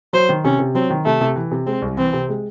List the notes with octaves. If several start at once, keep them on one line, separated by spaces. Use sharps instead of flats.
F#3 C5
D#3
C3 C#4
C3
F#3 C4
D#3
C3 A3
C3
E3
C3
G#3 C4
C2
E3 C4
C3
G#3